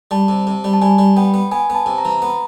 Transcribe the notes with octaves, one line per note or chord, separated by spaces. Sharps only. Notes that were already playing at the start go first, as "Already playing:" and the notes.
G3 A5
C3
C3
G3
A5
G3 G#5
G3
B3 G5
B3
B3 G#5
B3 A5
C3
A#5
E3
B3